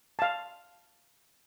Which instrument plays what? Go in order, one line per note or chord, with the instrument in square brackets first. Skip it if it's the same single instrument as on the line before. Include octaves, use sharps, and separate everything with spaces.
[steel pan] F5 A5